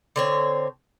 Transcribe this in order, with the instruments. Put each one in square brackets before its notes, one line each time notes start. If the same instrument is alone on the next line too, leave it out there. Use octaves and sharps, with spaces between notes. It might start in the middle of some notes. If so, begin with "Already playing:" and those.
[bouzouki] D3 C4 C#5